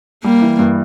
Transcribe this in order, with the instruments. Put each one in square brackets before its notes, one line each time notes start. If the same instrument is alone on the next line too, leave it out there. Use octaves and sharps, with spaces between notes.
[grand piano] G3 [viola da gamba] A#3
[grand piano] E3
G2